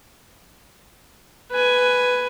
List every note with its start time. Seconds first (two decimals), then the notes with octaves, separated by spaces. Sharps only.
1.51 B4 G#5